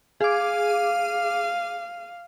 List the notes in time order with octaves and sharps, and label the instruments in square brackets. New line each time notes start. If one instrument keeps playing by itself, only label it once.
[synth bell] G#4 D6 [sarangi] F5